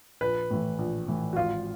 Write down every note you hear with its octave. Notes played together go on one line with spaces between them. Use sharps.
A#1 B4
A2 E3
A#1
A2 E3
F#4
G#1 F4